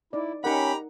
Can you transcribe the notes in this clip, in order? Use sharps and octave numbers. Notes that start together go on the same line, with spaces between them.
D#4 E4 D5
C#4 D#4 G4 A#4 F#5 A#5 B5